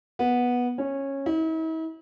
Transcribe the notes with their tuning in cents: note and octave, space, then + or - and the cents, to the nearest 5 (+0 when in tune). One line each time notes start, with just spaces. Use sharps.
B3 -10
C#4 -15
E4 -45